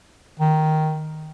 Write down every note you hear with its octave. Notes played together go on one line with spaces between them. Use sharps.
D#3